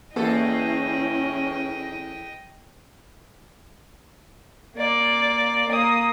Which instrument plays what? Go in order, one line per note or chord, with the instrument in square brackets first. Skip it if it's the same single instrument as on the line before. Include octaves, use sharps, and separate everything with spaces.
[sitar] E2 A4 [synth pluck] A#3 [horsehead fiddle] C#4 E4 [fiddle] D#5 G5
[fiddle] A#3 D5
A#3 D#6